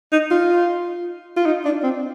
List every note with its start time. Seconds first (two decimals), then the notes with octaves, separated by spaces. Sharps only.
0.12 D#4
0.31 F4
1.37 F4
1.46 D#4
1.65 D4
1.83 C4